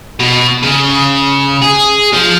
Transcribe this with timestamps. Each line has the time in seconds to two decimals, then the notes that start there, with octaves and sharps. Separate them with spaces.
0.20 B2
0.63 C#3
1.62 G#4
2.14 F3